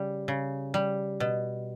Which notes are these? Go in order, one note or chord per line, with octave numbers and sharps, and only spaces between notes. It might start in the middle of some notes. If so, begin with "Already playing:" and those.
Already playing: C#3 G3
C#3
G3
B2